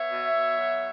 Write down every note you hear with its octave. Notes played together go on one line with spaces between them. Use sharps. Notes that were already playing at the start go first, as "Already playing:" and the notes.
Already playing: B3 C#5 E5
B2
B2
F#3